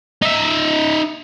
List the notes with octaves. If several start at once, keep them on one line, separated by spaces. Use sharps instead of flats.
D#4 E5